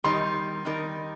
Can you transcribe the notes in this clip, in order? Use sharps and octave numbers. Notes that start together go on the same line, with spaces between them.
D#3 G3 D#4 A#4 C6
D#3 G3 D#4 A#4